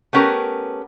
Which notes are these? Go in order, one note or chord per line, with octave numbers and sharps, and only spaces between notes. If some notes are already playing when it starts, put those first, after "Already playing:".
A3 B3 C#4 G4 A#4